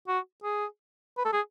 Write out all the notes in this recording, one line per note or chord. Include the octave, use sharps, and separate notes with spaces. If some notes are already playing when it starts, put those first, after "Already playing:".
F#4
G#4
B4
A4
G#4